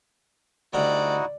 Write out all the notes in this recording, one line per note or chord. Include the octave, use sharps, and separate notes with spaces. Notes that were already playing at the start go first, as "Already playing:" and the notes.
D2 G3 D#4 E4 F#4 D5 F#5